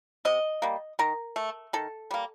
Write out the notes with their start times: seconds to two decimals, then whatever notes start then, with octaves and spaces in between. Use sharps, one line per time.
0.25 C3 D#5
0.62 G3 A#3
0.99 D#3 A#4
1.36 A3
1.73 D#3 A4
2.11 G3 A#3